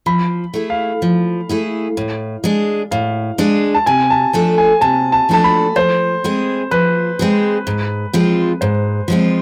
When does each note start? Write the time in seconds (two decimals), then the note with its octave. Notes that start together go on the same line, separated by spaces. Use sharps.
0.06 F3 B5
0.54 A3 E4 G#4
0.70 F5
1.02 F3
1.49 A3 E4 G#4
1.97 A2
2.44 G#3 D4 G#4
2.91 A2 F5
3.38 G#3 D4 G#4
3.74 A5
3.86 C3 G#5
4.10 A5
4.33 F3 A3 D4 A4
4.58 G#5
4.81 C3 A5
5.12 A5
5.29 F3 A3 D4 A4 A5
5.44 B5
5.76 F3 C5
6.24 G#3 C4 G#4
6.71 F3 B4
7.19 G#3 C4 G#4
7.67 G#2
8.13 F3 G#3 C4 F4
8.61 G#2 C5
9.08 F3 G#3 C4 F4